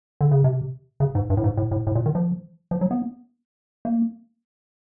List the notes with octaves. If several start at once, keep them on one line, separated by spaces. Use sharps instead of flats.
D3
C#3
C3
C#3
G#2
G2
A2
G#2
A2
A2
A2
A#2
D#3
F3
F3
F#3
B3
A#3